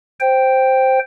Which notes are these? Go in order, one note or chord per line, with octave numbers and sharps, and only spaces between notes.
C5 G5